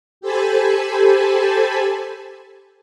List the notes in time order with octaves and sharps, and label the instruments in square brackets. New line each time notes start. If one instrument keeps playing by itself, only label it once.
[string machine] G4 A4 C5 G#5 A5 B5